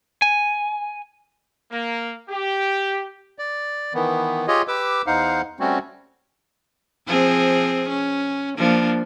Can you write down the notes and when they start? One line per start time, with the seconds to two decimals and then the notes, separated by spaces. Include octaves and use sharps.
0.22 G#5
1.71 A#3
2.29 G4
3.39 D5
3.94 D#3 E3 B3
4.48 F4 G4 G#4 C#5 D#5
4.68 G4 B4 D6 E6
5.07 E2 D#4 C5 F5 F#5
5.60 G3 A3 C4 C#4 F#4
7.07 F3 C4 G#4
7.89 C#4
8.57 F3 A#3 D4